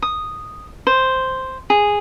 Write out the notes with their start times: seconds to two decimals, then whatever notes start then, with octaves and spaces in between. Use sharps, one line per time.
0.02 D#6
0.87 C5
1.70 G#4